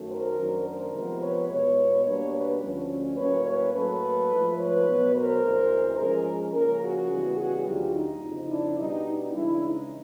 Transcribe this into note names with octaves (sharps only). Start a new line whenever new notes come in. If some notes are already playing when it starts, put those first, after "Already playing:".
Already playing: F#2 D#3 F#3 A3
A#4 C5
F#2 D#3 F#3 A3 D4
A#4 C5
C3 F3 G#3 B3
B4 C#5
E2 B2 G#3 B4 C#5
B2 G3 A#3 D4 B4 C#5
B4 C#5
D2 D3 F3 A3 C#4
A2 F#3 A#3 C#4 B4 C#5
B4 C#5
A2 F#3 A#3 A4 B4
G#2 F3 A3
B4 C#5
B2 F#3 B3
A#4 C5
D2 C3 E3 G#3
G#2 F3 G#3 C#4 G#4 A#4
C#3 F3 A#3 G#4 A#4
F#4 G#4
C#3 E3 G3 B3
F#4 G#4
D2 D3 F#3 F4 G4
D#4
F2 C#3 F3
D4 E4
B2 G3 B3 D4 D#4
D#4
C#3 E3 G#3 D4 E4
D#4